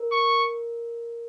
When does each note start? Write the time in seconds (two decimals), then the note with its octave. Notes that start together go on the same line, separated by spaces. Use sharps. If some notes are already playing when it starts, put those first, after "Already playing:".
Already playing: A#4
0.12 C#6